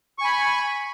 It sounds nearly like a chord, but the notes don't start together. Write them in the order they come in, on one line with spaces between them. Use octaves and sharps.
C#6 G#5 B5